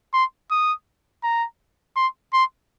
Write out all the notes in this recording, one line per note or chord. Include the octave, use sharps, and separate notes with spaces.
C6
D#6
A#5
C6
C6